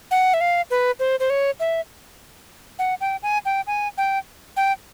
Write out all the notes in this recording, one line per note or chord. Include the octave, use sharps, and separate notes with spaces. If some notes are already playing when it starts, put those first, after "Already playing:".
F#5
E5
F5
B4
C5
C5
C#5
E5
F#5
G5
G#5
G5
G#5
G5
G5